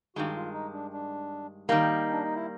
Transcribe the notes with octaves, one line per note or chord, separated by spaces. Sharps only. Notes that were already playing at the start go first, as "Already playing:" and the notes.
G2 D#3 G#3 F#4
F4
D#4
D4
D4
D#3 G3 A#3 D#4
D4
D#4
E4